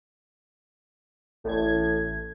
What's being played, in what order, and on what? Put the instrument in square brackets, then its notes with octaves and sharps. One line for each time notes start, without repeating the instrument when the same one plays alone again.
[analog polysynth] A1 G#6 [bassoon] A2